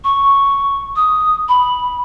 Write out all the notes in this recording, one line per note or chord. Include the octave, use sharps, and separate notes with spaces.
C#6
D#6
B5